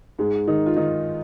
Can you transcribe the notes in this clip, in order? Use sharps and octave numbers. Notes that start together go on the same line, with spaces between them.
G#2 G#3
D#3 D#4
F4
D#3 D#4